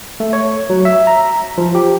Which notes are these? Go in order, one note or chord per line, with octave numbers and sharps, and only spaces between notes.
A3
C#5
F#3
E5
A#5
F3
G4